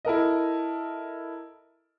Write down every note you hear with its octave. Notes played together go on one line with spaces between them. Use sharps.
E4 A4 A#4 D#5